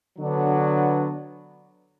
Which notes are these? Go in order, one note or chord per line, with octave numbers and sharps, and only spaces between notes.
D3 F#3 B3 D4